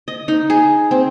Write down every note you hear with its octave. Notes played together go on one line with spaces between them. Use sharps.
D#5
D#4
G#4
C4